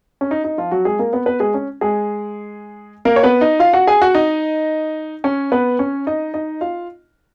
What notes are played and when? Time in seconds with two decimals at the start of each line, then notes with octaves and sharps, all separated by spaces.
0.21 C#4
0.31 D#4
0.44 D#4
0.58 F3 F4
0.71 F#3 F#4
0.85 G#3 G#4
0.99 A#3 A#4
1.13 B3 B4
1.26 B3 B4
1.40 G#3 G#4
1.54 C#4
1.81 G#3 G#4
3.05 A#3 A#4
3.16 C#5
3.23 B3 B4
3.41 D#4 D#5
3.60 F4 F5
3.73 F#4 F#5
3.87 G#4 G#5
4.02 F#4 F#5
4.15 D#4 D#5
5.24 C#4 C#5
5.52 B3 B4
5.79 C#4 C#5
6.07 D#4 D#5
6.34 D#4 D#5
6.61 F4 F5